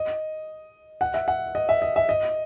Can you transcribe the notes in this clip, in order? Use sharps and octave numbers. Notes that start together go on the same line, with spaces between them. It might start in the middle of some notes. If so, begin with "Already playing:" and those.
Already playing: D#5
F#5
E5
F#5
D#5
E5
D#5
E5
D#5